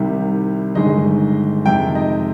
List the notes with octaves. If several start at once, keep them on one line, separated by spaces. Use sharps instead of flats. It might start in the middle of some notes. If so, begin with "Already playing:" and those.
Already playing: C2 C3 D#3 G3
G1 G2 D#3 G#3 D#5
F2 C3 D#3 G#3 G5
D#5